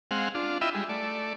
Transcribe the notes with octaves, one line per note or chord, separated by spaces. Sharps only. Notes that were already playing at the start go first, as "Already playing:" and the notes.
G#3 C4 F5 F#5
D4 F4
E4 F4 D#5 E5 G5 B5
G3 G#3
A3 D5